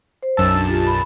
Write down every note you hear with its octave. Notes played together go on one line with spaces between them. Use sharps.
C5
B1 F#2 A5 E6
D4
F4 G4
B5